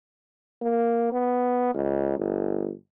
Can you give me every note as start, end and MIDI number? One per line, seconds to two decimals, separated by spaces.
0.62 1.08 58
1.12 1.71 59
1.74 2.14 37
2.18 2.71 31